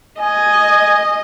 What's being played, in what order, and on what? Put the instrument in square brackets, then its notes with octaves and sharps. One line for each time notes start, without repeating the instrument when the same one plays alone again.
[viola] D#5 [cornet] G#5